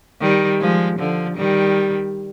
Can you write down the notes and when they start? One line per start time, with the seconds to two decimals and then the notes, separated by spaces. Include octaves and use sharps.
0.21 D#3 G3
0.61 F3 G#3
0.99 D3 F3
1.37 D#3 G3